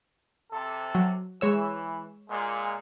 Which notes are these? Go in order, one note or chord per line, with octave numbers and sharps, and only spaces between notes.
C3 A4
F#3
E3 G#3 C#5 E6
A#2 G#3